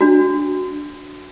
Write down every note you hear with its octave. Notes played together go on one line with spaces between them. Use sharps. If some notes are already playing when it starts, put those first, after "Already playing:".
D4 F#4